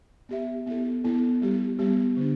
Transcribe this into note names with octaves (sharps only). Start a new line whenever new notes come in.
B3 G4 E5
B3 E4 A4
B3 E4 A4
G3 B3 G4
G3 B3 G4
D3 B3 D4